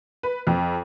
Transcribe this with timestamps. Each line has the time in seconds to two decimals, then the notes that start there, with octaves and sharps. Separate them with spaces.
0.23 B4
0.47 F2